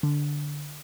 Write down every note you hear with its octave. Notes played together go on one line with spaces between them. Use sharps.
D3